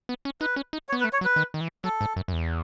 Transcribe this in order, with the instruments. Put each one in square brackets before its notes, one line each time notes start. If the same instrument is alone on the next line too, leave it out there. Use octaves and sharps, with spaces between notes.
[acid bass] B3
C#4
[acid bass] D#4 [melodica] B4
[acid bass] C#4
D#4
[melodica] C#5
[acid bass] B3
[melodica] B4
[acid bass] A3
[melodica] C#5
[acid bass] F#3
[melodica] B4
[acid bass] D#3
D#3
E3
[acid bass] F#3 [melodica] A4
[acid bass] G#2
F#2
F#2
E2